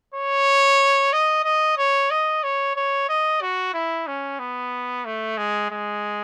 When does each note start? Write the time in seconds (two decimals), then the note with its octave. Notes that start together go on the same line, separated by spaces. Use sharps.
0.14 C#5
1.13 D#5
1.45 D#5
1.78 C#5
2.10 D#5
2.43 C#5
2.76 C#5
3.09 D#5
3.41 F#4
3.74 E4
4.07 C#4
4.40 B3
5.05 A3
5.38 G#3
5.71 G#3